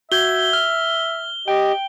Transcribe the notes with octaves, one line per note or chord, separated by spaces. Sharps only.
F#4 E5 G6 G#6 G7
F6
G4 D#5 G5